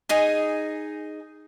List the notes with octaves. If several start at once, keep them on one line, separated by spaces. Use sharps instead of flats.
D#4 G#4 G#5